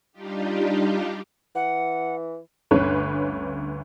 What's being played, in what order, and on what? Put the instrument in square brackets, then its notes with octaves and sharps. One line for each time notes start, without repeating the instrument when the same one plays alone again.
[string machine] G3 D4 D#4 F4 G4
[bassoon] E3 [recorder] F#5
[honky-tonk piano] G1 D2 C#4 B4 C#5